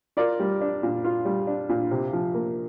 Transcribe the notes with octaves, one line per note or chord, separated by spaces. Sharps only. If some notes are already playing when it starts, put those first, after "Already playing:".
F4 A#4 D5
G3
D4
A#2
F4
G3
D4
A#2
C3
F3
A#3